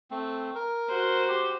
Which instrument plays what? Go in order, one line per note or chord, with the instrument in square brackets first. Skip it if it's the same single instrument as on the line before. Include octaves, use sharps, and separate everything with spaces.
[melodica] A3 C4
A#4
[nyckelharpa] F#4 C5
[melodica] G4